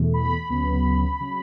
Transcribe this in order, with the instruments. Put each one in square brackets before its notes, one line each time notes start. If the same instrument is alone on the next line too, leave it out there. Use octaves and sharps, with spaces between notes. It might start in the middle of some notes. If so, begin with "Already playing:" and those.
Already playing: [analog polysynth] E2 B2 A3
B5
D2 C#3 F#3 B3
C#3 F#3